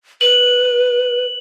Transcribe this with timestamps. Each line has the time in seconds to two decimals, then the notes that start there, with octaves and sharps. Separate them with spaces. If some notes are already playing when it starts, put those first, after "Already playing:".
0.21 B4 F#7